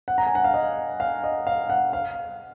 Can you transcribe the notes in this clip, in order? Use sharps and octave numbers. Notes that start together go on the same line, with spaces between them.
F#5
A#5
G#5
F#5
F5
D#5
F5
D#5
F5
F#5
F5